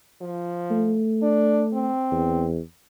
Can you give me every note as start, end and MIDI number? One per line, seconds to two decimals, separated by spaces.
0.22 0.98 53
0.71 1.91 57
1.23 1.64 62
1.74 2.46 60
2.11 2.60 40